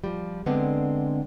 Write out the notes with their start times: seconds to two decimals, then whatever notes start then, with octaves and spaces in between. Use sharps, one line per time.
0.04 F3 G3
0.46 D3 G#3 B3 C4 D4